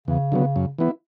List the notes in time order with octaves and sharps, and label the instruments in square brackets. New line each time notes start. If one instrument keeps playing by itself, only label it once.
[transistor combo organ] E2 [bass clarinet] C#3
[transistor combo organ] D3 F#3 B3
F#2
E3 B3 E4